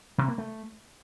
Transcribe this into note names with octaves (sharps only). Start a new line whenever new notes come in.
C3
A#3
A3